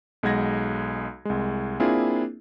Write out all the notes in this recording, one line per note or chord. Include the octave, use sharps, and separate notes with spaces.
B1 G#3 F#5 G#6 A#6
C2 G#3
A#3 C4 D4 E4 F4 G#4